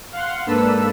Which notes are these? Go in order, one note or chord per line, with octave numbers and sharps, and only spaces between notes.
F5 F#5 C6
G#2 A#3 D4 A4 B4 E6